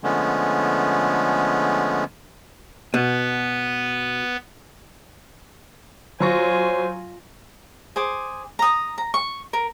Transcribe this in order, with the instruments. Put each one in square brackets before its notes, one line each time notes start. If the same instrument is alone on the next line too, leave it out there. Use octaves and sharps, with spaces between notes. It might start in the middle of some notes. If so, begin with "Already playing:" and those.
[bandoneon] D3 F3 G#3 A3 B3 C#4
[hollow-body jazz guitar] B2 [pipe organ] B3 B4
[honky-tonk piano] F#3 C#6 A#6 [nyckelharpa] F4 G#5 [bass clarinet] C5
[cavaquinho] G#4 C5 D6
A#5 D#6
A#5
C#6
A#4